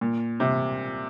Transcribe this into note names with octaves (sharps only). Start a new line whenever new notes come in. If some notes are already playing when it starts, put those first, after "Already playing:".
A#2
C3